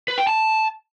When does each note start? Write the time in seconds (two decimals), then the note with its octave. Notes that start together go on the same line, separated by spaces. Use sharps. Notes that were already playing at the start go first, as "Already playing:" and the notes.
0.08 B4
0.18 G5
0.27 A5